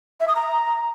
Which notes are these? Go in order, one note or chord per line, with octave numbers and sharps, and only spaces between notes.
E5
D#6
A#5